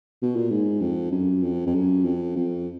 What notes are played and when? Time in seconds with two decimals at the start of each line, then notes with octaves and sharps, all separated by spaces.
0.22 B2
0.36 A#2
0.50 G#2
0.81 F2
1.12 F#2
1.43 F2
1.67 F2
1.74 F#2
2.05 F2
2.36 F2